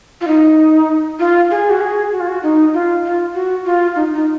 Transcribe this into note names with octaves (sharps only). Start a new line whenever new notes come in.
F4
D#4
F4
G#4
F#4
G#4
F#4
F4
F#4
D#4
F4
F4
F#4
F4
D#4
D#4